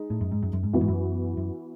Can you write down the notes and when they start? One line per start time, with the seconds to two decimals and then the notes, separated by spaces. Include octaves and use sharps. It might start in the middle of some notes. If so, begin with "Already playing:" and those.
Already playing: G#3 D#4
0.10 A2
0.21 F#2
0.31 G#2
0.43 F#2
0.53 F#2
0.63 G#2
0.73 F#2 E3 B3 F#4
0.81 G#2
0.88 F#2
1.37 F#2